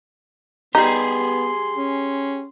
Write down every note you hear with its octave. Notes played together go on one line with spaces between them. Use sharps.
G3 B3 D#4 G4 G#4 C6
C#4